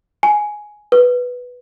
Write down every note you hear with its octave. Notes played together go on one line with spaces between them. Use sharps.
G#5
B4